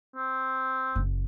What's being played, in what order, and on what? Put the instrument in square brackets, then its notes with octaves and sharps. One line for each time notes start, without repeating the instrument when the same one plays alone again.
[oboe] C4
[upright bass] F#1